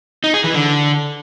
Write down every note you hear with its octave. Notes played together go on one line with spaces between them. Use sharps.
D#4
G#4
E3
D3